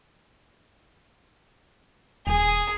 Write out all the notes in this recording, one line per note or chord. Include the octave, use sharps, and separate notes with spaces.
D#1 G#4